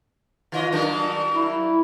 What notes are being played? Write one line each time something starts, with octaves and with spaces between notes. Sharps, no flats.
D#3 F4 D#5
F#3 A#3 D4
E4